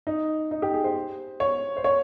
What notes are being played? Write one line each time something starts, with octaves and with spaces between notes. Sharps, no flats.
D#4
D#4
G4
G#4
C5
C#5
C5
C#5